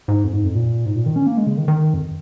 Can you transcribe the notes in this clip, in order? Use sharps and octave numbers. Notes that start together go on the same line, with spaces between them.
G#2
F2
G#2
F2
A#2
G#2
A#2
D#3
C#4
A#3
G#3
C#3
D#3
D#3
F2